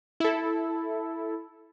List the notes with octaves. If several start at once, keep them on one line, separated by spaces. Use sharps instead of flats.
E4 A4